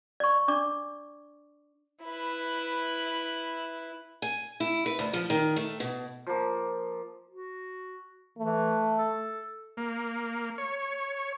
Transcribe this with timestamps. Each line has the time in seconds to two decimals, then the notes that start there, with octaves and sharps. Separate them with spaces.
0.20 D5 C#6
0.48 D4 D5 D6
2.03 E4 B4
4.22 G#5
4.60 E4
4.86 B4
4.99 D2
5.13 F3
5.30 D#3
5.56 A3
5.80 B2
6.27 F3 A#3
7.31 F#4
8.38 E3 A3
8.98 A4
9.77 A#3
10.58 C#5